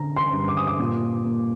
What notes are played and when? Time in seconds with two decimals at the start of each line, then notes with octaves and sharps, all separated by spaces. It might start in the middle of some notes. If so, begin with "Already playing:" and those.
Already playing: D3 A#5
0.16 C6
0.32 G2
0.48 D6
0.57 D#6
0.67 D6
0.80 A#2
1.25 A#3